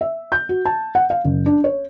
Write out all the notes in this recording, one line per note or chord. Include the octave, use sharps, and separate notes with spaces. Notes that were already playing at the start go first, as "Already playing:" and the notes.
E5
G6
F#4
A5
F#5
F5
F#1
D4
C#5